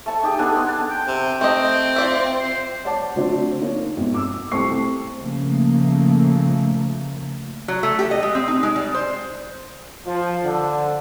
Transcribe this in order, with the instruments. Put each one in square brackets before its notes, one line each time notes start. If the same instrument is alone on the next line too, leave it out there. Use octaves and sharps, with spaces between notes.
[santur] A3 A5 C#6
D#4 G4 G#4
B3 D4 A4 G#5
B3 C6
A5
[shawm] G5
[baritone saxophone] C3
[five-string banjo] A3 D#5 [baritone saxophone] C4
[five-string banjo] F4 D5 E5
[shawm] C5
[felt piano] C#5 D5 F#5 A5 D6
D3 F#3 A3 C4 D4 C5
A#3 D#4 A#4 C#5
G1 F2 G#2 B2
D6 E6
C2 A3 C4 C#6 C7
[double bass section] C#3 F3 A3 A#3
[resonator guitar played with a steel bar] F#3
A3
G4
D#5
G#3
C4
D#4
G#3
G3
C5
[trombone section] F3
D3